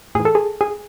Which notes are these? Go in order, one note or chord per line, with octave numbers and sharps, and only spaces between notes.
A2 E3 G#4
A4
G#4
G#4